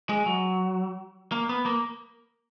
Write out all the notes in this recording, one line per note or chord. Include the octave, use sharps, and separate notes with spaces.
G#3
F#3
A#3
B3
A#3